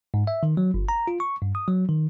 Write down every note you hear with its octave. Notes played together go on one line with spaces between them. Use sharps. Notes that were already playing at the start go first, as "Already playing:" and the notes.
G#2
E5
D#3
F#3
G1
A#5
F4
C#6
G2
D#6
F#3
D#3